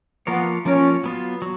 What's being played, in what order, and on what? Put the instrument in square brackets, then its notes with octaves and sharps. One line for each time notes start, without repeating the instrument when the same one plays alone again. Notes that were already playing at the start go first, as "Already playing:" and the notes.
[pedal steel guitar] F3 A#3 F4 A#4 C#5 [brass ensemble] B3
[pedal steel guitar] F3 A#3 F4 A#4 C#5 [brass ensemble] C#4
[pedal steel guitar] F#3 B3 F4
F#3